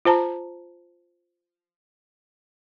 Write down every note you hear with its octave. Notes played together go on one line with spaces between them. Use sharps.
F4 C5 A5 A#5